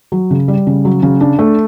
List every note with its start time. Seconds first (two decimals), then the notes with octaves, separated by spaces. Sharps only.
0.12 F#3
0.31 C#3
0.48 G3
0.67 C#3
0.85 F#3
1.03 C#3
1.21 D4
1.39 A3